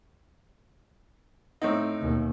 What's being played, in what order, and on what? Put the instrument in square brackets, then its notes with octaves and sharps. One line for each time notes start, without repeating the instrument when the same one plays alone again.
[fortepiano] A2 C4 D#4
[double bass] D#2 B2